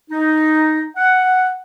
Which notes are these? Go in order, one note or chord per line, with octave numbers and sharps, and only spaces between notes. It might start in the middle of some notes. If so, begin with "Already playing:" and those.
D#4
F#5